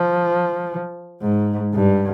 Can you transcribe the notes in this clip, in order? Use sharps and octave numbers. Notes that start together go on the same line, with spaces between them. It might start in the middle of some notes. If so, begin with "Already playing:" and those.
Already playing: F3
G#2
G2